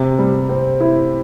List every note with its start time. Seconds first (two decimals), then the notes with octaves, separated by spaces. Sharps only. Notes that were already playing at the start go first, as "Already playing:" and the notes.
Already playing: C3
0.19 G3
0.49 C4
0.80 E4